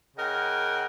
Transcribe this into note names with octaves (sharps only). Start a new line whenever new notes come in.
C#3 A#4 D#5 F#5 G5